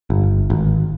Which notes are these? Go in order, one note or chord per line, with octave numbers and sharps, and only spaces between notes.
G1
G#1